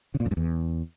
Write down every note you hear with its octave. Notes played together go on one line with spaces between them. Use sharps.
C#3
A#2
F2
G2
E2